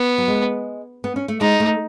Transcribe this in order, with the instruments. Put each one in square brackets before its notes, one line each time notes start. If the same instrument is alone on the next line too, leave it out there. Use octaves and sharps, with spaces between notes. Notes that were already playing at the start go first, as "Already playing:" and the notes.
Already playing: [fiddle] B3
[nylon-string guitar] F#3
G#3
B3
C#4
A3
[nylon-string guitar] G#3 [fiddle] D#4
[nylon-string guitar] A3